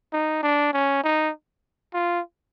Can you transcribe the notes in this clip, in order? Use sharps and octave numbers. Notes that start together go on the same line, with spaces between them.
D#4
D4
C#4
D#4
F4